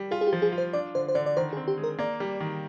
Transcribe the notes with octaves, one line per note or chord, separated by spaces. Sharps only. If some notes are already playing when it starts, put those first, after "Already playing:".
Already playing: G3
F4 G#4
G#4
G4
F3
G#4
F4
C5
D4 D5
D3 C5
C5
D3 D5
D5
D#3 C5
G#4
C4
G4
G#3
A#4
A#3 D5
G3
D#3